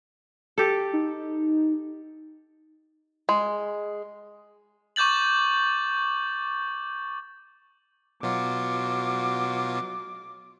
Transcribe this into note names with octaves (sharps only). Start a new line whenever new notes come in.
G4 A4
D#4
G#3
C#6 D6 G6 A6 F#7
B2 F#3 F4 D6